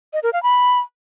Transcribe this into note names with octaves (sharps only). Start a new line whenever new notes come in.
D#5
A#4
F5
B5